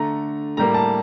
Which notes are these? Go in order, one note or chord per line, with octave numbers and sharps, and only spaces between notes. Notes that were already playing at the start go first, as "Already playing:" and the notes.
Already playing: D3 A3 A#5
A2 G3 A#3 A#5
A5